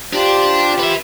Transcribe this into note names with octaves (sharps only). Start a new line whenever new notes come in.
D4 F4 G4 C5
B4 E5